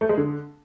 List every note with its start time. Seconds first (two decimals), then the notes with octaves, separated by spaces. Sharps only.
0.01 A3
0.09 G#3
0.17 D3